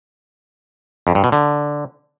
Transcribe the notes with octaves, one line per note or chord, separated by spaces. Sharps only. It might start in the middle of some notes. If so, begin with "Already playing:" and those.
F2
G2
B2
D3